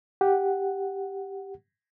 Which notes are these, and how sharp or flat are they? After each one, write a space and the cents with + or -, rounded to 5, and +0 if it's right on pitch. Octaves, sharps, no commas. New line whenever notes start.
G4 +0 F#5 +0